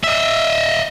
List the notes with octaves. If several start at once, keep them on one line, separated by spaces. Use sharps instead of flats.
D#5 E5